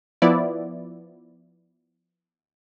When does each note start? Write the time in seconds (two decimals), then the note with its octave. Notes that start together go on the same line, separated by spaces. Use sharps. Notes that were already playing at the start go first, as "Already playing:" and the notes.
0.22 F3 B3 E4 D5